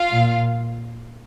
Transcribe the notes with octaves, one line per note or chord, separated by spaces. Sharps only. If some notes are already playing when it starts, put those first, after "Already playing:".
Already playing: F4 F5
A#2